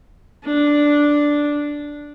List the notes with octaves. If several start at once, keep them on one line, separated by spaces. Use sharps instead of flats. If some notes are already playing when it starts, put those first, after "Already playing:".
D4